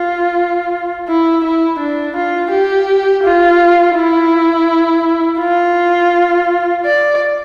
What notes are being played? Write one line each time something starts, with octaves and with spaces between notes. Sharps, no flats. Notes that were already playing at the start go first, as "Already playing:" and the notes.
Already playing: F4
E4
E4
D4
F4
G4
F4
E4
F4
D5